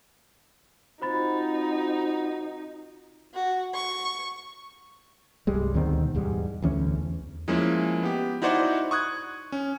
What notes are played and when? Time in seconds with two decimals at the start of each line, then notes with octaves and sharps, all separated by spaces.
1.02 C4 D#4 F4 F#4 C5 B5 A6
3.33 F#4
3.73 C#6
5.47 C2 G2 G3 G#3
5.74 D2 B2 D#3 C4
6.15 E2 G#2 G3 G#3
6.62 D2 E3 C#4
6.96 E2
7.48 F3 G#3 A#3 C#4 E4
8.03 B3 G4
8.42 D#4 E4 F#4 C5 D5 F#5
8.91 C#6 D#6 F#6 G#6
9.52 C#4